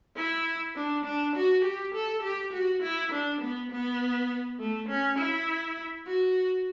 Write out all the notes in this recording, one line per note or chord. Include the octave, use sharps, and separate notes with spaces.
E4
D4
D4
F#4
G4
A4
G4
F#4
E4
D4
B3
B3
A3
C#4
E4
F#4